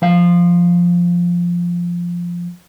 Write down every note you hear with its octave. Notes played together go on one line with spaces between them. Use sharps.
F3 F5